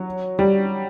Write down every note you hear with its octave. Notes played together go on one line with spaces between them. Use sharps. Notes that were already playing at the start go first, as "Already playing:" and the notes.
Already playing: F#3
G3